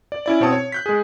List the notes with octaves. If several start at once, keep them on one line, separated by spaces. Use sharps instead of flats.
D5
C#4 E4 D5
B2 C4 C#5 A5 D#6
C#5
F#6 G6 B6
G#3 G#4